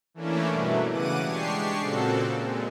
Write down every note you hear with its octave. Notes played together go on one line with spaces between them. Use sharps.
E3 A3 A#3 C#4 D4 E4
G2 B2 F#3 A3
C#3 E3 F#5 D6 D#7
G#3 D4 G4 C#6 C7
A#2 C#3 C4 F#4 A4
A#2 G#3